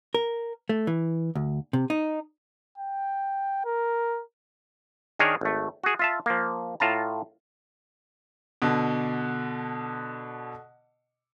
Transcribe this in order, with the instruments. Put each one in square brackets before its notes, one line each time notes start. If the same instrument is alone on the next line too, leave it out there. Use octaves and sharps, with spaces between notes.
[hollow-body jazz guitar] A#4
A3
E3
D2
C3
D#4
[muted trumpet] G5
A#4
[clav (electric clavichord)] D#3 D4 G#4 A#4 C#5
G#1 A3
F#4 G#4
F4 E5 A5
F3 A#3
A2 F4 A5 A#5
[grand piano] B2 D3